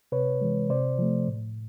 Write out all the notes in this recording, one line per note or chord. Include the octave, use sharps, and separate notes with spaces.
C3 B4 C#5
E3 G#3
C3 C5 D5
F3 A3
A2